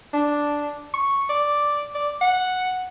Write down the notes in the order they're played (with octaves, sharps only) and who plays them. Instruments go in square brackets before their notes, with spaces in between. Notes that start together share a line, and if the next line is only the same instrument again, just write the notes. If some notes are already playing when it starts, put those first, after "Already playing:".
[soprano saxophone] D4
C#6
D5
D5
F#5